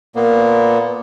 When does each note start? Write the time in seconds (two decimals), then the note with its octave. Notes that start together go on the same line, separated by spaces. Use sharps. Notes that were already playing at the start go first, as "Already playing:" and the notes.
0.16 A#2 A#3 B3